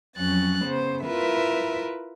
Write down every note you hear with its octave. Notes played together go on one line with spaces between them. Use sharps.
F2 F#3 C#4 F#6 A6
C#3 B3 C5
E4 F4 A#4 B4 E5